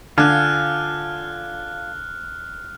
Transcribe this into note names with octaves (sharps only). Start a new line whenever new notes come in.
D3 F4 F5 G#5 F6 F#6